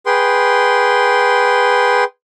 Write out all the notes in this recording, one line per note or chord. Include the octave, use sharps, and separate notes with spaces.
G#4 B4 G5 C6